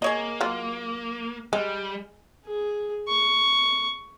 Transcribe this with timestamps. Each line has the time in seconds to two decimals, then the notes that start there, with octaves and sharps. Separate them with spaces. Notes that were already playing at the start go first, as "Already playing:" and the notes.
0.02 A#3 G#4 C#5 D#5
0.41 F#3 F4
1.53 G3 G#3
2.46 G#4
3.08 C#6